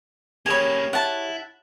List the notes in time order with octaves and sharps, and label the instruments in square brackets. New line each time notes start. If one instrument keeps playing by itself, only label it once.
[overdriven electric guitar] A#3 C#4 [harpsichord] G4 G#4 C#5 [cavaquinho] G#5 B5
[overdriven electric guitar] E4 [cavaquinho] F#5 A5